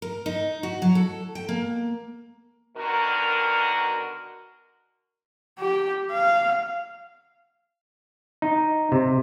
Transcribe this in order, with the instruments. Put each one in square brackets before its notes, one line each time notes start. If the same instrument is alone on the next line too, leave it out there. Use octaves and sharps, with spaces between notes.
[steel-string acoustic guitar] A#4
D#4
F#4
F#3
A4
G5
A#3
[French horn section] B2 D3 D#3 F#4 A#4
[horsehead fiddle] G4
F5
[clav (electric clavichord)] D#4
C3